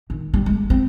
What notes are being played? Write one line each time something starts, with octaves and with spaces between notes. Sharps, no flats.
D#3
G3
G#3
C4